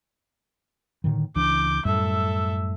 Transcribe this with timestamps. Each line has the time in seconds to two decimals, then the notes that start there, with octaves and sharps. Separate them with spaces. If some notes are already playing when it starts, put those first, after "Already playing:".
1.04 A2 D3 D#3
1.36 C#2 E3 D4 D6 G6
1.85 F#2 A2 G3 A4 E5